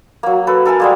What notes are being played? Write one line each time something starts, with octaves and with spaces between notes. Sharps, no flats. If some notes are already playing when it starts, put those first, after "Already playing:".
F#3 A#3
A4 B4
A4 A#4 G#5 A5
G3 G#3 A#3